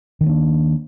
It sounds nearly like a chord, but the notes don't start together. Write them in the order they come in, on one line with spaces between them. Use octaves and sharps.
D#3 B3 A#3 D4